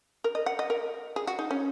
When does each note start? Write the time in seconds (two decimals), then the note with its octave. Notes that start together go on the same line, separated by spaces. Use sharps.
0.24 A#4
0.35 D#5
0.46 F#5
0.59 D#5
0.70 A#4
1.16 G#4
1.27 F#4
1.39 D#4
1.51 C#4